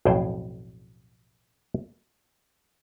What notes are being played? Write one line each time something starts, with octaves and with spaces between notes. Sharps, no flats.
B1 F2 A2 G#4 C5 G5